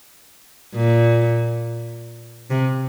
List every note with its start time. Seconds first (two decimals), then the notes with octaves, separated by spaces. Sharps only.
0.74 A#2
2.50 C3